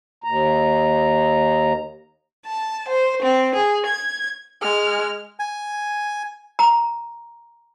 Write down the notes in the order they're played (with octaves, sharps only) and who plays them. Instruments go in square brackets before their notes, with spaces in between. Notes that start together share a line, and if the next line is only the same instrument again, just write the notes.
[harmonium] D#2 A#5
[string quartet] A5
C5
C4
G#4
G#6
[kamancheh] G#3 F6
[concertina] G#5
[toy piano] A#5